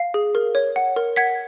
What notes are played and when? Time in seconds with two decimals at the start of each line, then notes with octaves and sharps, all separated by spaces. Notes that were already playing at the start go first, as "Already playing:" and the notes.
Already playing: F5
0.14 G#4
0.35 A#4
0.55 C#5
0.76 F#5
0.96 A#4
1.16 F#5 G#6 B6